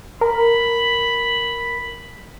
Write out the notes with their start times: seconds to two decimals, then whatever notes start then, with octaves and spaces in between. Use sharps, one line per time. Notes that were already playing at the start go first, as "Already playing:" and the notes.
0.21 A#4 B5